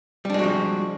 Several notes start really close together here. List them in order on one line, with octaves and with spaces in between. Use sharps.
G3 D4 G#3 F#4 F3